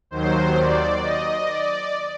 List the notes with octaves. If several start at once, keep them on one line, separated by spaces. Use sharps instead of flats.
D#2 D#3 F#3 C5
D5
D#5
D5